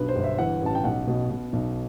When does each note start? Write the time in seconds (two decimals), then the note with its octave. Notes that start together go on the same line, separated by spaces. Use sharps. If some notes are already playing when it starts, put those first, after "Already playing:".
Already playing: B1 G2 B2 B4
0.08 C5
0.16 G1
0.24 E5
0.38 E3 F#5
0.62 A1 A5
0.75 G5
0.84 B1 F#5
1.07 B2
1.30 B2
1.53 B1